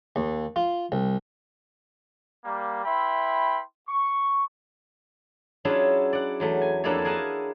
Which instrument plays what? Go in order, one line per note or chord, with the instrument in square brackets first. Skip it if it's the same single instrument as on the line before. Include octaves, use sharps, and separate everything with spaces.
[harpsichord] D#2
F4
C2
[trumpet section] G3 A#3
E4 B4 E5 G5 B5 C6
C#6
[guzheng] F#3 C#4 D4 E4 F4 G#4
D5 F#5
E2 F#3 A3
G#5
F2 A#3 D4 E4 A4 C#5
G#4 A#4 F#5 G#5 A5